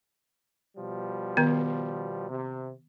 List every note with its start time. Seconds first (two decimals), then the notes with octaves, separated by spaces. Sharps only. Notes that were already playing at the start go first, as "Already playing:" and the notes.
0.76 B2 F3 G3
1.37 D#3 B3
2.29 C3